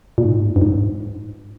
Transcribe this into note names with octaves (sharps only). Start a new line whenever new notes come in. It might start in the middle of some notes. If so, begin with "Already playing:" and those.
A#2
G#2
G2
G#2